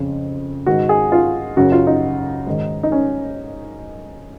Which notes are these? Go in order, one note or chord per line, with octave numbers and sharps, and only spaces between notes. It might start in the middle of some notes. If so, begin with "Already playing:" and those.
Already playing: F2 C#3
G#2 D#3 F#4
G#4
F4
F#2 C#3 F#4
F4
D#4
G#2 D#3
D#4
C#4